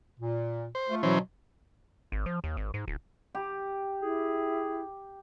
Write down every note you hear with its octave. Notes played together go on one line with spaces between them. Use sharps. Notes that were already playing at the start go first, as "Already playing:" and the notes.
A#2
C5
A3 F4
B2 E3 F#3 C#4 C5
G#1
F3
D#2
G#1
G#2
D1
G4
E4 G#4